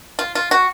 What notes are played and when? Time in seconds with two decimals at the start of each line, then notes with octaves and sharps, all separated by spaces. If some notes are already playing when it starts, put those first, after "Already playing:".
0.19 F4
0.35 F4
0.51 F#4